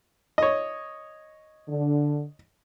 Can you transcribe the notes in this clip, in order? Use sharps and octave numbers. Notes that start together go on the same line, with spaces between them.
C#5 D#5
D3